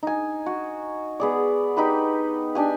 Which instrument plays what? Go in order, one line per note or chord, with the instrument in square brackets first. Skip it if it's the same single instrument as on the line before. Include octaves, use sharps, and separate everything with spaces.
[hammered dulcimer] D#4 G#5
F#4
B3 G#4 D5
D#4 G4 B4 B5
D4 G4 G#5